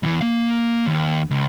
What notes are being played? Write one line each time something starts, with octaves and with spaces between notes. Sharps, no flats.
E2 E3
A#3 F5
D#2
C#2